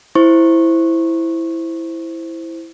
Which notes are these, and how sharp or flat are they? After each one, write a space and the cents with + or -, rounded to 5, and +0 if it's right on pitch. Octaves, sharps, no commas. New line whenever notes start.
E4 +0 C5 +0 C#6 -15